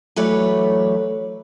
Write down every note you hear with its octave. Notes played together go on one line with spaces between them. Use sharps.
E3 F#3 A3 B4 C#5 D5